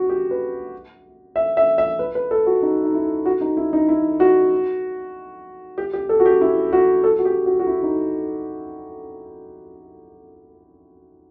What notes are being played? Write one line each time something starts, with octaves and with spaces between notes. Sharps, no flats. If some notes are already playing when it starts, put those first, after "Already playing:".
Already playing: F#4
G4
B4
E5
E5
E5
B4
B4
A4
F#4
D#4
D#4
E4
F#4
D#4
E4
D#4
E4
F#4
G4
G4
A4
F#4
G4
E4
F#4
A4
F#4
G4
F#4
F#4
E4
D#4